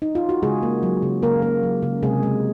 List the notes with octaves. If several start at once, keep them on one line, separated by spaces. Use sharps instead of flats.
D#4
F4
F#4
C#3 G#3 G#4
A#3
F#3
C#3
C#3 A#3 A#4
A#3
F#3
C#3
C3 G#3 G#4
G#3